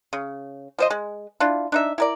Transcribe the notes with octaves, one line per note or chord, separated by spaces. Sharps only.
C#3
F3 C5 D#5
G#3
D4 E4 F4
D4 D#4 E5
E4 A#4 D5